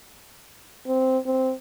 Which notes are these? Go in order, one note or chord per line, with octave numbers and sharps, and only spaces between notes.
C4
C4